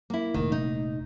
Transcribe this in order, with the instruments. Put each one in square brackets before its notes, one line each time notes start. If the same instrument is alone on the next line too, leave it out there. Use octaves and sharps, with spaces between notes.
[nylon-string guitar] A#3 E4
[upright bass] F1 A#2 [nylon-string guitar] D#3
[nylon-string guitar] D#4